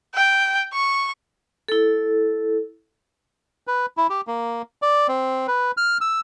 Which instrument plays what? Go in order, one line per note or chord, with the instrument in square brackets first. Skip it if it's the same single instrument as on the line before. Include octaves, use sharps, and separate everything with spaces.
[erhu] G5
C#6
[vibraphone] E4 A4
[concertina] B4
E4
G4
A#3
D5
C4
B4
F6
E6